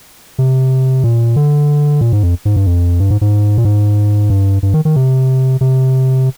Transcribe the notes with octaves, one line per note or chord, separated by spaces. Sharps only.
C3
A#2
D3
A#2
G#2
F2
G#2
G2
F2
G2
G#2
G#2
A#2
G#2
G2
G2
D#3
D#3
C3
C3